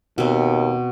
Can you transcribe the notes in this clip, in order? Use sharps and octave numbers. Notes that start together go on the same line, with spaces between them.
D#2 B2 C4